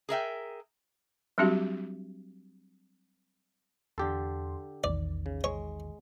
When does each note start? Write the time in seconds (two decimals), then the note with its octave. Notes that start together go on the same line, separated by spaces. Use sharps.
0.09 G#4 A#4 E5 G5
1.38 F#3 G3 C4 D4 F#4 G4
3.98 E2 D3 G4 A4 C6
4.84 A#1 E2 D#3 D5
5.26 C#3
5.44 G#3 C#5